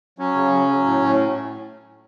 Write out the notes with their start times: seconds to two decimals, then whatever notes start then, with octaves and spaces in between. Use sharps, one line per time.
0.19 F#3 C#4
0.35 C#3
0.52 F#3
0.68 F#3
0.85 A2
1.01 A2